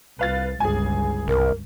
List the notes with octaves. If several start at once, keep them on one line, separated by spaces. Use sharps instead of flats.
C2 B4 F5 A6
G1 C#2 G#4 G#5
C2 A#4